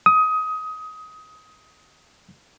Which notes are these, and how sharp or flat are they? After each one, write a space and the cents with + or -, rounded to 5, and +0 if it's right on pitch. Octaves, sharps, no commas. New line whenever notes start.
D#6 +20